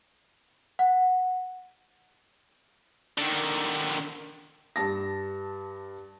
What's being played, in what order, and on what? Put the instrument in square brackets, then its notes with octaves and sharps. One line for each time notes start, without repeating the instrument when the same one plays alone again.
[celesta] F#5
[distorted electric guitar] D3 D#3
[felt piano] G2 A5 A#6